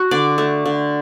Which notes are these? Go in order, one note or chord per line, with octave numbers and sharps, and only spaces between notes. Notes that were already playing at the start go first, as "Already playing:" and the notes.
Already playing: F#4
D3 D5
A3
D3